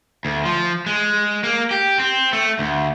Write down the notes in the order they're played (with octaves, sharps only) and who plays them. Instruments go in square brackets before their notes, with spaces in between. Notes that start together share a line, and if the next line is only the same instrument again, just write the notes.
[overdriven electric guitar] D2
F3
G#3
A#3
G4
C4
A3
D2